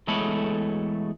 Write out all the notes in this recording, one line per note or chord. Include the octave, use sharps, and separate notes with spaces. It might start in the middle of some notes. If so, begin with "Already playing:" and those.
E2 G#3 A3 A4 C#5 B5